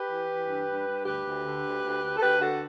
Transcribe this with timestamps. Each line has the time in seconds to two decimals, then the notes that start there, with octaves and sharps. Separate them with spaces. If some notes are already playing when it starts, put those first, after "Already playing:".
Already playing: G4 B4
0.09 E3
0.28 E3
0.47 G2
0.68 G2
0.86 G2
1.05 D2 G4 B4
1.25 D2
1.45 D3
1.63 D2
1.83 D2
2.03 D2
2.17 A4
2.21 D2 G4 B4
2.40 D3 F#4 A4